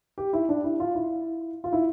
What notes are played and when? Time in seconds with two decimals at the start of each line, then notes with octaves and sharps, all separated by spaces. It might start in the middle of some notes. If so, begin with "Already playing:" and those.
0.18 G4
0.33 E4
0.49 D4
0.64 E4
0.80 F4
0.95 E4
1.64 F4
1.73 E4